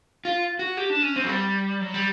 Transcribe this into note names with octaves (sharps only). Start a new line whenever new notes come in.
F4
F#4
G4
D4
C#4
C4
F#3
G3
F#3
G3